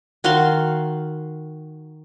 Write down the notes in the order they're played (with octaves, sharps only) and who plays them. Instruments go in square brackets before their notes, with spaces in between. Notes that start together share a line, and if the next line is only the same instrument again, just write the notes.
[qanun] D#3 F#4 F5 C6